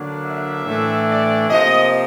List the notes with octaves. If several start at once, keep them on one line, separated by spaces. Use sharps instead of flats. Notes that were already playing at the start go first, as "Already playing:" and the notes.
Already playing: D3 F#3 A#3 D4
E5
A2 E3 A3 D4
D5
C3 F3 A#3 D#5